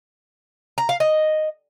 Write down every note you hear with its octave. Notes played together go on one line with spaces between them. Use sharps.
A#5
F5
D#5